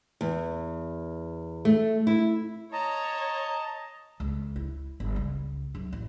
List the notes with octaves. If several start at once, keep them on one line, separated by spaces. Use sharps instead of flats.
E2
A3
E4
C#5 D#5 A5 A#5
C#2
E4
G1
C#2
F#2
A1